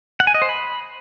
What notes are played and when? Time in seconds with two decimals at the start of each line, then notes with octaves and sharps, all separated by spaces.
0.20 F#5
0.27 G#5
0.34 D#5
0.42 C5
0.49 B5